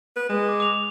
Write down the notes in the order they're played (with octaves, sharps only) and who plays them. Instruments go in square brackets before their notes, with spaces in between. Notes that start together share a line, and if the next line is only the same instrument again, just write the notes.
[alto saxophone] B4
G#3
[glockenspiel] D6
D6 F7